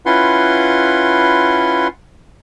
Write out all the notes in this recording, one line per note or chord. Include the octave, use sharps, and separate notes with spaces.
C#4 E4 F4 B4 F#5 C6